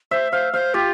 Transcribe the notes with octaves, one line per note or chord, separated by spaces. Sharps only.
C5 E5
C5 F5
C5 F5
F4 G4